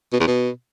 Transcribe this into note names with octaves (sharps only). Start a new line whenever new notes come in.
B2
E2
B2